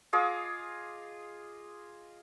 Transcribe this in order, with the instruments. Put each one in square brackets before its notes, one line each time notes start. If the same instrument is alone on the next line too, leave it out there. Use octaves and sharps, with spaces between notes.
[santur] F4 G#4 D#5 D6